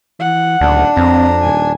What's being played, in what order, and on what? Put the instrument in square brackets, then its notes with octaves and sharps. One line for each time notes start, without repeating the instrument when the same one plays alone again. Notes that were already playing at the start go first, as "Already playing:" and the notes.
[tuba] E3 [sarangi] F#5
[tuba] D#1 [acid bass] D2 [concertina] D4
[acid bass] F2 [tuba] C4 [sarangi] A#5
[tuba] D#1 [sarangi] G#5